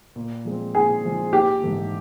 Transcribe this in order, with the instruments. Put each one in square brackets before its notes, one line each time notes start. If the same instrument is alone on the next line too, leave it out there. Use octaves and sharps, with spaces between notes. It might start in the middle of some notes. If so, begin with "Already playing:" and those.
[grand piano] A#2
F3 G#3 C4
[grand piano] A#2 [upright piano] G#4
[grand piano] F3 G#3 C4
[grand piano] A#1 [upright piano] G4
[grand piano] G#2 E3 A3